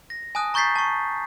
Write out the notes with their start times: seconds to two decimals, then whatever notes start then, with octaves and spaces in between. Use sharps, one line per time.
0.10 A#6
0.35 G#5 A5 D#6 F#6
0.54 A#5 C#6 G6 A6 B6 C7
0.76 A5 C#6